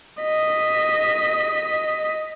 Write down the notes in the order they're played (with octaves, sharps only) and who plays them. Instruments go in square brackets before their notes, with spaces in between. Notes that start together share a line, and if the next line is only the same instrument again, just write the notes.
[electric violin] D#5 B6